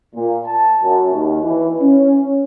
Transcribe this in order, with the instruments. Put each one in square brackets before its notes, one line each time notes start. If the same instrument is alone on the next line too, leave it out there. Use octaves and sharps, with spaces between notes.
[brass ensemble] A#2
A5
F#2
D#2
E3
C#4